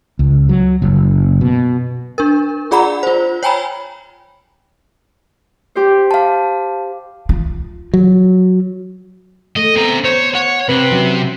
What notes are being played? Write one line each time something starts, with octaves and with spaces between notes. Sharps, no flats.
C#2
F#3
F#1
B2
D4 A#4
F4 G#4 D5 F#5 A#5 B5
F4 C5
C#5 G5 G#5 A#5 B5
G4 C5
F5 A5
F4
F#3
A3 D#5
B3 C4 A#5
C5 C#5
C#5 F#5
C3 C4 B4
F#3 C#4